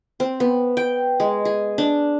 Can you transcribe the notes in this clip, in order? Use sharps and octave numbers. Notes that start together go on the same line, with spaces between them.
C4
B3
G5
G#3
G#4
D4